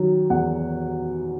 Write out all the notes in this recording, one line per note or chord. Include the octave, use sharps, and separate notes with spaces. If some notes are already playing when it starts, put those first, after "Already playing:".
Already playing: D#3 F#3
E2 F#5